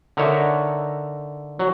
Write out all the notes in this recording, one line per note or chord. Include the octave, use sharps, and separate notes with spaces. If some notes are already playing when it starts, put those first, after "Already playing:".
D3 D#4 A#4 C#5 E5
F#3